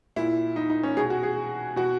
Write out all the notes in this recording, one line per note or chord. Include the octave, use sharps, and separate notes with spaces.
A#2 E4
D#4
D#4
C#4
B2 G#4
F#4
G#4
B2 F#4